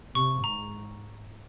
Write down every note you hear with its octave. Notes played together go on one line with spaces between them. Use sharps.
C3 C#6
G#2 A#5